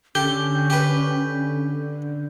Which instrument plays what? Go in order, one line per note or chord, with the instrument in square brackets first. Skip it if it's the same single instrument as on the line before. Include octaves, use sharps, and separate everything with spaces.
[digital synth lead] D3 [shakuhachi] C#4 [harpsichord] G4 [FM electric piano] G6
[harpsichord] G4 B4